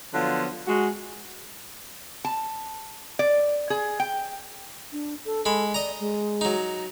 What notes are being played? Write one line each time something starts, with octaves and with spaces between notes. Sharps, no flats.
D3 F3 F#3 B3 F4
G#3 F#4
A5
D5
G#4
G5
D4
A4
G#3 A4 B5
D5 D#5 A#5
G#3
F#3 D#4